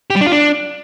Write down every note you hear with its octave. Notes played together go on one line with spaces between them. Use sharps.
G4
G3
D4
F4
D4